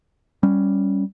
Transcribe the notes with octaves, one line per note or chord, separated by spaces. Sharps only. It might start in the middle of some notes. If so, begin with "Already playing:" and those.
G3 C#4